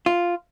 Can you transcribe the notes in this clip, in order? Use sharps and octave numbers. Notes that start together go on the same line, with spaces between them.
F4